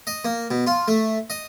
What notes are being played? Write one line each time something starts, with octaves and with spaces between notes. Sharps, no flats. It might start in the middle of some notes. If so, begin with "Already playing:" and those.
D#5
A#3
B2
F4
A3
D#5